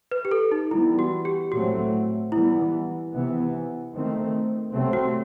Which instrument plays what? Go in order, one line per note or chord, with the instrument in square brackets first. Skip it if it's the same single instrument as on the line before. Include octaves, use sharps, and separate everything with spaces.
[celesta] B4
G4
A4
D#4
[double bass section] E3 G3 B3 [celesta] E4
[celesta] F#4
G4
[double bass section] A2 F#3 A3 C4 [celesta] F#4
[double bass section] E3 G3 B3 [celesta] E4
[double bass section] C3 E3 B3
D#3 A3 C4
C3 F#3 A3 C4
[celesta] F#4